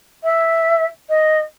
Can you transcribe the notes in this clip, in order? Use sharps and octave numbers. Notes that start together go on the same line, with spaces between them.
E5
D#5